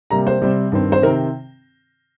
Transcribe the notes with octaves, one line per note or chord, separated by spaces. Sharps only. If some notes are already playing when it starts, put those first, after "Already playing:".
C3 G3 A#3 A#5
C5
C3 G3 C4
G2 D#3 C4
C5
C3 D#3 C4 A#4